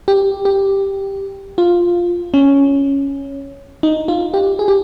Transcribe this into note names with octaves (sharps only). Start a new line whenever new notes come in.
G4
G4
F4
C#4
D#4
F4
G4
G#4
G4